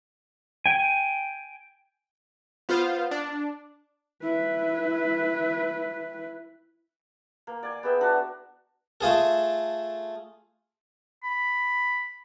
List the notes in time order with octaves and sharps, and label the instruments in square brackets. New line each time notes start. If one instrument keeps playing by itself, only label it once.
[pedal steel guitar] G5 G#5
[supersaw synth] B3 F4 C5 F5
D4
[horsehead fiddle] E4 B4
[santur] A#3
D5 G#5
B3 G#4 E5 G5
D4 F#4
[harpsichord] A3 F4 G#4 A4
[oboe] B5